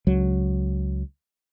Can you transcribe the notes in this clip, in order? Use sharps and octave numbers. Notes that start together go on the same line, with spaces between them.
C#2 F#3